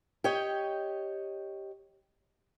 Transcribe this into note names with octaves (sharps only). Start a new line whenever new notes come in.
G4 C#5 D#5 G5